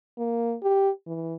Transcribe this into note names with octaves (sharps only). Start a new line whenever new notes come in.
A#3
G4
E3